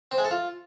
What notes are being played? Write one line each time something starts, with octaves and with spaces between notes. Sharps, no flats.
C4
G#3
A4
F4